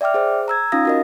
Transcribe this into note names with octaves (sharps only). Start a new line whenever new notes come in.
D5 E5 G5 D6 F6
G#4 C5
A#5 E6 G#6
C#4 D#4 F4 F5 D#6 A#6
F#4 A#4 D#5